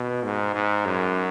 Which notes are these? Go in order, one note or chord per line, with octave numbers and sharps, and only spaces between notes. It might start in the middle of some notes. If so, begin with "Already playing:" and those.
Already playing: B2
G#2
G#2
F#2